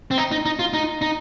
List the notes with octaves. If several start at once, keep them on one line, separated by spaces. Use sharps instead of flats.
C4
D#4
D#4
D#4
F4
D#4
D#4